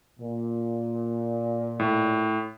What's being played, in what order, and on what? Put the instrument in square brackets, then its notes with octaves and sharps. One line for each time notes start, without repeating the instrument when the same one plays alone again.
[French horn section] A#2
[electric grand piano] A2